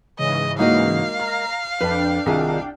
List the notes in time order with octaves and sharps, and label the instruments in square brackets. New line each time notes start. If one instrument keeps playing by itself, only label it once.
[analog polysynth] G#2 C#3 E3 [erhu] D#5
[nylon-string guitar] G#3 A#3 D#5 [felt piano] D#4 F#4 [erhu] F5
[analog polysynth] A#5 [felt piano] F6
[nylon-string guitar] F2 [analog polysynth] D4 G5 [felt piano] B4
[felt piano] C2 [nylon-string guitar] D#3 F4 G#4